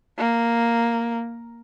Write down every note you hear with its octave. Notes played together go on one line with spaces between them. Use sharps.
A#3